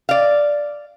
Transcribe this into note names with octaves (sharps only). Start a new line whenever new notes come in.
D5 F5